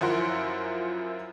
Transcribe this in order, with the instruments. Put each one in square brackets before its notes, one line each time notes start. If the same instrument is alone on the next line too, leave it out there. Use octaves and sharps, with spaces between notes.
[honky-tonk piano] F#2 F3 E4 A#4 F#5 C6